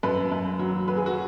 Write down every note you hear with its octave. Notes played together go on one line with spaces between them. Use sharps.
F#2 B4
F#2
F#3
F#3 B4
G#4
F#4